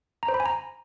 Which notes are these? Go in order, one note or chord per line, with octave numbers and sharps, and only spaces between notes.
A#5
C5
B5
G#5
A#5